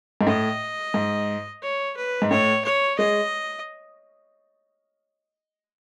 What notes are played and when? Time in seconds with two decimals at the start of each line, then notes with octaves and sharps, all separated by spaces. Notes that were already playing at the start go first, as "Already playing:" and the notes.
0.21 G#2
0.27 A2 D#5
0.94 G#2
1.62 C#5
1.97 B4
2.22 G#2
2.31 A2 C#5
2.64 C#5
2.99 G#3 D#5